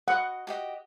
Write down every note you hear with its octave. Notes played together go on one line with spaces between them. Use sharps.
F#4 D#5 F#5
F#4 G4 D#5